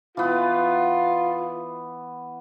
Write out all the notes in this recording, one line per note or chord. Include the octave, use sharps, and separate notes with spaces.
E3 B3 F4